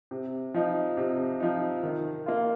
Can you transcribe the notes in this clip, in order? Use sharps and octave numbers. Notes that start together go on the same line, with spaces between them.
C3
F3 D#4
C3
F3 D#4
D#3
A#3 F4